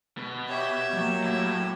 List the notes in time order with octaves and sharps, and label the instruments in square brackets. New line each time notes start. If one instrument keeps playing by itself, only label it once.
[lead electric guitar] B2
[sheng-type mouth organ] G4 C#5 [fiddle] E5
[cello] F#3 A#3
[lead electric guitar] A2